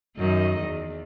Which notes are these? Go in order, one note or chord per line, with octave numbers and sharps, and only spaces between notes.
F#2 D#3 D#5
E2